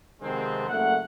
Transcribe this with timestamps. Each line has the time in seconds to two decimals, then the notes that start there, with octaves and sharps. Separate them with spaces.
0.22 C3 D#3 F3 G#3 B3 C4
0.68 F#1 A3 A#4 F#5